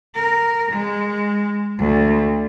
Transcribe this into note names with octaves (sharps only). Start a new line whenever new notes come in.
A#4
G#3
D2